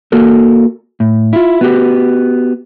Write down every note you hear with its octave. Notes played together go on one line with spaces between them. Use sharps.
A#3 F#4 A4 A#4
A2
E4 F4
B3 F#4 G4